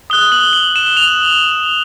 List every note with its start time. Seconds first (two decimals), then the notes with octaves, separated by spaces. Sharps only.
0.10 D#6 F#6 G7
0.32 F#7
0.53 F#7
0.76 E7
0.97 F7